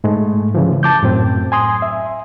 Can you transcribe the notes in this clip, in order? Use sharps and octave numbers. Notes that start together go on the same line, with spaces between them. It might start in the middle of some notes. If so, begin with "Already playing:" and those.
G#2 G#3 A3
C#3 E3 F3
A5 D6 G6
F#2 A2 C4
G#5 C6 D#6
E5